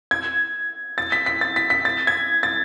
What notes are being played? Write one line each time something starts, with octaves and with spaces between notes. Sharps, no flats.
G#6
A6
B6
B6
A6
B6
B6
A6
G#6
A6